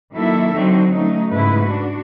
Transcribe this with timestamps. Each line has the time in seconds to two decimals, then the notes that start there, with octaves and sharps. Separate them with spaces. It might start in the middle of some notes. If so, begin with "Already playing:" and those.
0.14 D#3 F#3 A#3 E4 A4 E5
0.54 D3 F#3 C4 D#4
0.93 F#3 A3 C#4 D#4
1.33 G#2 C#3 A3 E4 B4
1.62 D4 F#4